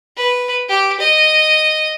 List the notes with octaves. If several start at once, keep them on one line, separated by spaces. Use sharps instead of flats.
B4
G4
D#5